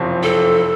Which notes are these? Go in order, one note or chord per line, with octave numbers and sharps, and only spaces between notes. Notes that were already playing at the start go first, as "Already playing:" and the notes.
Already playing: F#1 F2 C3 F3 C4
A4